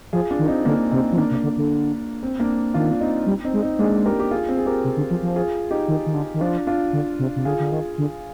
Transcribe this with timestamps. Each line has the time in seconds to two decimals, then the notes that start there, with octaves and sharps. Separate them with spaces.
0.13 F3 F4 G#4
0.31 D4 F4
0.39 D#3
0.48 C4 D#4
0.65 D3 A#3 D4
0.91 C3 C4 D#4
1.12 F3
1.18 D#3 A#3 D4
1.31 C3
1.43 D3
1.57 D3
2.23 C4
2.40 A#3 D4
2.74 D#3 D4 F4
2.92 D4
3.01 C4 D#4
3.26 G3
3.45 C4 D#4
3.53 G#3
3.62 C4 D#4
3.79 G#3 A#3 D4
4.05 G4 A#4
4.20 G4
4.31 F4 G#4
4.49 C4
4.57 G#4
4.66 G4 A#4
4.84 C3
4.97 D3
5.10 F3
5.22 F3
5.36 F4 G#4
5.71 D#4 G4
5.88 D#3
6.06 D#3
6.14 D3
6.34 D#3
6.41 F3 D4 F4
6.67 D4 F4
6.93 D3
7.19 C3
7.36 C3
7.45 D3 F4 G#4
7.60 D3
7.72 D#3
7.98 D3